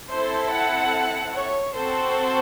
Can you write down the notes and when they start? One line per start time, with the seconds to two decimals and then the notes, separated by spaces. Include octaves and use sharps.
0.10 C4 E4 A4 C5
0.53 F#5
1.34 C#5
1.76 C4 F#4 A4 C5